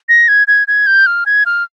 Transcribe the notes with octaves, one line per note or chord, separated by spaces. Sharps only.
A#6
G#6
G#6
G#6
G6
F6
G#6
F6